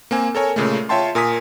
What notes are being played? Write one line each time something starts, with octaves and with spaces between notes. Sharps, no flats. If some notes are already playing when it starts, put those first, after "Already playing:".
A#3 C4 G#5
A4 A#4 C#5 G#5
A#2 C#3 G#3 A3
F4 C#5 E5 G5 A5 C6
A#2 A#4 G#5 D#6 B6